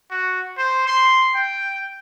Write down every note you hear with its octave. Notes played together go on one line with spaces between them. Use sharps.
F#4
C5
C6
G5